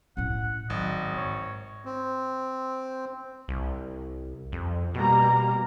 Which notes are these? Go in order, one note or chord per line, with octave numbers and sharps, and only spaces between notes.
A2 C#4 F#5
G#1 F#3 D#5
G#2 C#5
C4
C2
F2
B2 G3 A#3 A#5